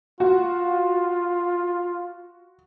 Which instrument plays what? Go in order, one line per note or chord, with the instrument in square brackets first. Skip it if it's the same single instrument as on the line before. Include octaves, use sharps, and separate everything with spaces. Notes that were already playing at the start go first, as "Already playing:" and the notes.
[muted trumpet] F4 [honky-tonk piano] F#4